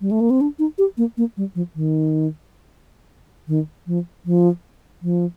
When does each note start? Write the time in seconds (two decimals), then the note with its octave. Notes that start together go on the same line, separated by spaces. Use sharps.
0.01 G3
0.11 A3
0.21 A#3
0.30 C4
0.41 D4
0.59 D#4
0.78 G4
0.97 A#3
1.17 A#3
1.37 G3
1.55 F3
1.75 D#3
3.48 D#3
3.87 F3
4.26 F3
5.02 F3